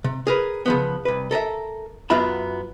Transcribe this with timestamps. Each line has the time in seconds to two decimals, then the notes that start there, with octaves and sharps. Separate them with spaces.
0.04 C3
0.27 G#4 A#4 B4
0.66 C#3 F3 B3
1.05 C2 B4
1.31 A4 A#4 D#5 E5
2.10 F#2 F#3 B3 F4 E5 B5